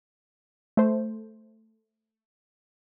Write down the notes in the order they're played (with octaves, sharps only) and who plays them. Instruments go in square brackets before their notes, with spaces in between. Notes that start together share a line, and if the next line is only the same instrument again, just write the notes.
[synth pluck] A3 C5